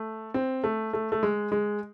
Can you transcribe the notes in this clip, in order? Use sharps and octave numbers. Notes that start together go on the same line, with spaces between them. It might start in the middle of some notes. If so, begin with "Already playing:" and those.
Already playing: A3
C4
A3
A3
A3
G#3
G#3